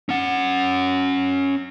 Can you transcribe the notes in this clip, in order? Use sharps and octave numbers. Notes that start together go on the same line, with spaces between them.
C#4 F#5